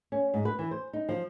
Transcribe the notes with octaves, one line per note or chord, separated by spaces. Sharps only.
C#4
G#2
B4
E3
C5
D#4
F3